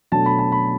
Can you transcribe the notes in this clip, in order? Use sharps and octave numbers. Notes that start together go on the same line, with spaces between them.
B2 F#3 A3 D4 A5
B5
A5
B5